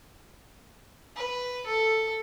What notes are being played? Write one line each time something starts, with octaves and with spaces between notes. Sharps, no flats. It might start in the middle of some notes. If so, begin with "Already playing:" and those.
B4
A4